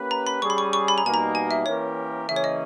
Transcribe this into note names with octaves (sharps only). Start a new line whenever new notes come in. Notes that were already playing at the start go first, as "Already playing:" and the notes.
Already playing: A#3 C#4 G4 B4
A#5
B5
G3 C#4 G#4 C#6
B5
C#6
C#6
B5
A#5
B2 G3 A#3 D#4 G#5
A#5
G#5
E5
E3 A#3 C#4 G4 A#4 C#5
C#3 E3 A#3 C#4 G#4 E5
C#5
D#5